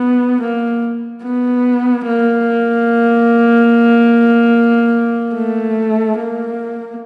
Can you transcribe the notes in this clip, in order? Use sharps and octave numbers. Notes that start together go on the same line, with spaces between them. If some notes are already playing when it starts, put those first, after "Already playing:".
Already playing: B3
A#3
B3
A#3
A3
A#3